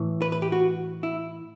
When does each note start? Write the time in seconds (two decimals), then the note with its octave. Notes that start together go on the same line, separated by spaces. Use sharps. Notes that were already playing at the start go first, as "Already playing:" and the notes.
Already playing: A2 E3
0.22 B4
0.32 B4
0.42 G4
0.52 F#4
1.03 E4